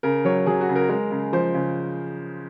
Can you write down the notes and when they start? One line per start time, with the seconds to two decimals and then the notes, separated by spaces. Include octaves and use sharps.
0.03 C#3 A#4
0.25 F#3 C#5
0.46 F#3 G#4
0.61 F#4
0.69 C#3
0.76 A#4
0.89 G#3 A#4
1.11 C#3
1.33 F3 C5
1.54 C#3